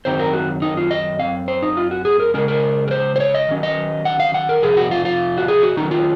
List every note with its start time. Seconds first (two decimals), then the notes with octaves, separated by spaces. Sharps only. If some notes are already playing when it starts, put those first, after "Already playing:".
0.05 F#2 D#3 F#3 C4 D#4 C5
0.19 A#4
0.33 F#4
0.62 D#4
0.77 F4
0.91 D#5
1.19 F#2 F3 C4 F5
1.48 C5
1.62 D#4
1.77 F4
1.91 F#4
2.05 G#4
2.20 A#4
2.34 C#3 G#3 C#4 A#4
2.48 A#4
2.88 A#4
2.91 C5
3.16 C5
3.20 C#5
3.35 D#5
3.49 D#3 F#3 C#4
3.63 D#5
4.05 F#5
4.20 F5
4.34 F#5
4.49 A#4
4.62 F2 C3 G#4
4.77 F#4
4.91 F4
5.05 F4
5.38 F#4
5.48 G#4
5.63 F#4
5.77 D#3 F#3 C#4 D#4
5.91 F4